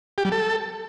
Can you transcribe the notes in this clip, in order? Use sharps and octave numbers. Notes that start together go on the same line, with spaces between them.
G4
G3
A4